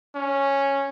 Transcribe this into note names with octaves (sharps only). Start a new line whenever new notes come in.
C#4